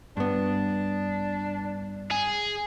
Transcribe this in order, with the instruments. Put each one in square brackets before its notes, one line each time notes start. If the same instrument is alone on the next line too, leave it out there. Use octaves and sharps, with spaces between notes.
[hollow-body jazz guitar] G2 B3 [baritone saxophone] D4
[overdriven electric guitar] G#4